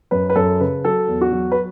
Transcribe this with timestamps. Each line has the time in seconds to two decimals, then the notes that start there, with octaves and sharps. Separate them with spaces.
0.11 F#2 B4
0.30 B4
0.36 F#2 A4
0.60 C#3 B4
0.84 F#3 A4
1.08 E2
1.21 F#4
1.32 F#3
1.51 B4